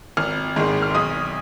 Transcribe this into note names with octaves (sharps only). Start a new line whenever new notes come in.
G#1 F6
G#2 D#3 G#3
F6
B1 D#6